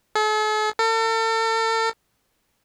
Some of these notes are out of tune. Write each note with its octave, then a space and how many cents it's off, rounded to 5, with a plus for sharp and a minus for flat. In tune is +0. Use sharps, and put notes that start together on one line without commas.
A4 -45
A4 +40